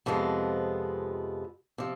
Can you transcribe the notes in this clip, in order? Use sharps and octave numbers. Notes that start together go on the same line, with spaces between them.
F2 C3 F3 G#3 B3
C3 F3